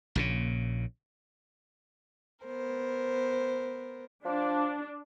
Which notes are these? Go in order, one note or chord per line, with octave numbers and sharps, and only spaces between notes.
A#1 A#2 C#3
B3 A#4 C5
F3 D4